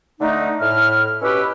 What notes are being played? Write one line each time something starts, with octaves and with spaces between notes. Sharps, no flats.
D3 A3 D#4
A2 F6
B2 C#4 E4 G4 B4 E6